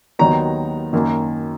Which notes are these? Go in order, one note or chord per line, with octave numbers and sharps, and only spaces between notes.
D#2 D#3 F#3 B3 D#4 A#5
F#2 D#3 A#3